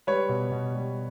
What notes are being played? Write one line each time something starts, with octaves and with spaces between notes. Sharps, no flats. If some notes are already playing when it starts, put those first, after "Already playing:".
G3 B4 C#5
B2
B2
G3